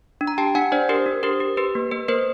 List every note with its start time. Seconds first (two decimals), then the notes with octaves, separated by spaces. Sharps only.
0.21 D4
0.27 A#5
0.38 G4 G5 A5
0.55 D4 F#5 G#5
0.72 D4 C5 D5
0.89 G4 A#4 C5
1.06 D4
1.23 G4 A#4 C5
1.40 G4
1.57 G4 B4
1.75 A#3
1.91 A#3 B4
2.08 A#3 A#4 C5